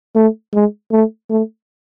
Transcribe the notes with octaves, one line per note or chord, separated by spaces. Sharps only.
A3
G#3
A3
A3